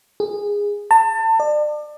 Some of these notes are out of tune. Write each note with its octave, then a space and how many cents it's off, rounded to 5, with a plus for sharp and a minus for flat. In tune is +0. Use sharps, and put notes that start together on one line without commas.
G#4 -15
A5 +30
D5 +35